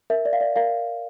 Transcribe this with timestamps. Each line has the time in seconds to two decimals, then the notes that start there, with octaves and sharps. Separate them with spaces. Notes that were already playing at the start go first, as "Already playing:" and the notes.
0.10 A#4 E5
0.25 D5
0.33 F5
0.41 D5
0.56 A#4 F5